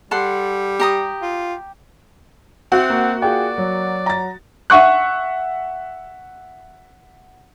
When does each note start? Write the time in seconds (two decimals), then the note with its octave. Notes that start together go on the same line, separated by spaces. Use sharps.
0.11 G3 A4 F#5 C6
0.80 G4 A#5 D#6
1.22 F4
2.72 C4 F#4 E5 F#5
2.90 A#3
3.22 F4 G#4 D5 G5
3.58 F#3
4.06 A#5 A6
4.70 E5 F#5 C#6 F#6